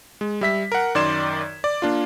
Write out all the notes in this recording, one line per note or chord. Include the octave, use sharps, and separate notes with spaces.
G#3
G3 E5 B6
A#4 F#5
F#2 D#3 D5 C6 G#6 E7
D5
A#3 D4 F4